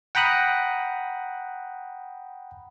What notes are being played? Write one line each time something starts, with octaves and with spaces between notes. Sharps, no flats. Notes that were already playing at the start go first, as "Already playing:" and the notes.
F#5 G5 A#5 B5 D#6 F#6